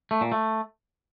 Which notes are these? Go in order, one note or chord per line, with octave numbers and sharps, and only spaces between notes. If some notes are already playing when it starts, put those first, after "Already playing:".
A3
A#2
A3